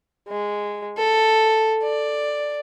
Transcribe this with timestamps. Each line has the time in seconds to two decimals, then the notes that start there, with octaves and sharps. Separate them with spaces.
0.28 G#3
0.98 A4
1.83 D5